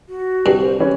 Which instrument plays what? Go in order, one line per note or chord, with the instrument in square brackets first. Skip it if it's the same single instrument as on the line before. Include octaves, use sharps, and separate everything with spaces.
[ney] F#4
[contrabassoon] C2 [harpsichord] G2
[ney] C5
[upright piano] E3 C#4 [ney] B4